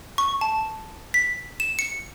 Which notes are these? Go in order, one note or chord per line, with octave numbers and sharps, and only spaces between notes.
C#6
A5
B6
E7
C#7